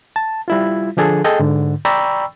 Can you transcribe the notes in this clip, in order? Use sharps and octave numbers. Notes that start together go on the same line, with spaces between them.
A5
G3 E4 F4
D3 F3 D4 G#4 A4
G#4 A4 D#5 G5
G#2 D3
D5 G5 A#5 B5 C#6 E6